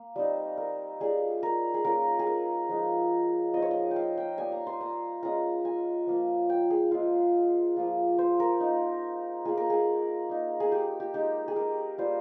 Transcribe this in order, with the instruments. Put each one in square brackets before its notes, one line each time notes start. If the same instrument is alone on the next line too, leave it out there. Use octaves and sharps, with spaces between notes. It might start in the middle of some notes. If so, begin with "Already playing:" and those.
Already playing: [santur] A#3
G3 C4 D#4
A#4
G3 C#4 F4 G#4
A#4
G#4
A#3 C#4 F4 A#4
G#4
A#4
F3 G#3 D#4
F3 C4 D#4 D#5
C#5
D#5
G5
F5
G5
G3 A#3 D#4 G#5
A#5
C6
A#5
G#3 C#4 F4 A#5
G#5
F3 A#3 F4
G5
G#4
G#3 C4 F4
F3 A#3 F4
C5
A#4
A#3 D#4
A#3 F4 G#4
A#4
G#4
A#3 D#4
G#4
G4
G4
G#3 D#4 G4
G#4
A#4
G3 A#3 F4 C5